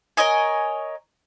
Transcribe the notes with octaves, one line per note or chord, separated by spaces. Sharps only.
A#4 C#5 D#5 G#5